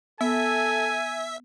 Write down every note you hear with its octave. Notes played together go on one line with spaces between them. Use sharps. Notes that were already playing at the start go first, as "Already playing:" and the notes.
B3 A4 E5 G#5